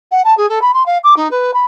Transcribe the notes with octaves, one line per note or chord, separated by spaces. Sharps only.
F#5
A5
G#4
A4
B5
C6
F5
D6
D#4
B4
B5